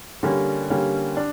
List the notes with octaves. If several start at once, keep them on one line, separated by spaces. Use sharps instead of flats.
D3 G3 A#3 C#4
D3 G3 A#3 C#4
D4